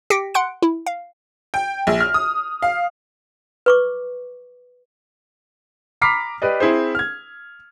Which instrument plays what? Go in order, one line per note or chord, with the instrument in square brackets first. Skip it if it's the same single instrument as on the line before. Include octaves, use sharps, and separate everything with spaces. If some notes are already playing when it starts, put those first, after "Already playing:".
[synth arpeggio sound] G4 G5 A#6 B6 C#7 D7
F#5 C6 F#6 C#7 D7
E4
F5
[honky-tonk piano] G5
A#1
F6
D#6
F5
[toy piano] B4 C#6 D6
[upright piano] A#5 B5 D6 F6 B6 C7
G4 B4 D5 D#5
C4 E4 G#4 C5
F6 G#6